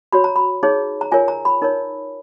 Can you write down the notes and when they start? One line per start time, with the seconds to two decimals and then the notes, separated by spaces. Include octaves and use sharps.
0.13 F#4 C#5 B5
0.24 A#5
0.36 B5
0.63 D#4 G#4 C#5
1.01 A#5
1.12 F4 A#4 C#5 G#5
1.28 A#5
1.45 B5
1.62 D#4 A#4 C#5